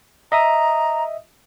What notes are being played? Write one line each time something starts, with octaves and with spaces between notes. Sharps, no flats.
D#5 E5 A#5 D#6